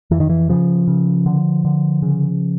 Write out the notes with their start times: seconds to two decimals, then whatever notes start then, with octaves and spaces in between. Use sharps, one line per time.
0.11 F2 E3
0.20 D#3
0.30 E3
0.49 C#3 F3
0.88 C#3
1.26 D3
1.65 D3
2.02 C#3